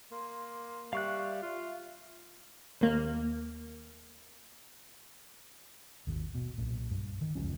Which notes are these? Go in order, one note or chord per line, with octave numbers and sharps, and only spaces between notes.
A#3 C6
G3 E5 F5 C#6 F#6
F4
D#2 A#3
G#1 D#2
B2
B1 A#2
G2 G3
D#3
F1 C#2 F3 C#4